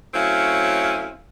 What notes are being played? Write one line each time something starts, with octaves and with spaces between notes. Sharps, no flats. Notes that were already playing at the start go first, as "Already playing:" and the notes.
F#3 A3 C4 C#4 E4 F5